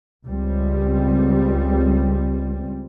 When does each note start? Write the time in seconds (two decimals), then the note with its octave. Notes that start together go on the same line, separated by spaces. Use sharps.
0.27 C#2 G3 C4